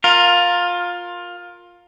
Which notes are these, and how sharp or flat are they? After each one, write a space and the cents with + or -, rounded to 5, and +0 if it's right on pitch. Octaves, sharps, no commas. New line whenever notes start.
F4 +15 A#4 +0